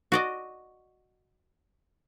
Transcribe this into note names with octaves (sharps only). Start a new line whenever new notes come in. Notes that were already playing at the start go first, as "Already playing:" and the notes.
F#4 D5 D#5